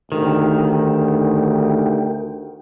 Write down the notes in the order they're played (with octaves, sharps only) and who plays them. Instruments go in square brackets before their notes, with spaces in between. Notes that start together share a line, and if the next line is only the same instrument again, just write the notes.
[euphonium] D2 [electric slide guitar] D#3 [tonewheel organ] G4 A#4 G5